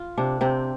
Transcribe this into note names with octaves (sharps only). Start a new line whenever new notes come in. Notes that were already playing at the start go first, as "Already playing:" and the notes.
Already playing: F4
C3 D4
C3 C4